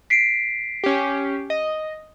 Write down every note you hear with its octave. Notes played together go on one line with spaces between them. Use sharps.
B6 C7 D7
C#4 G4
D#5